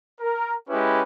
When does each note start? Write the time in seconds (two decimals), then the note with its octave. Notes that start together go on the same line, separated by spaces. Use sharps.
0.20 A#4
0.68 G#3 C#4 E4 G4 B4